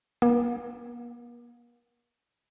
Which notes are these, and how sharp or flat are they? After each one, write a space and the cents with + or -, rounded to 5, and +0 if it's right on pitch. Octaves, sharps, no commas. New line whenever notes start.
A#3 +45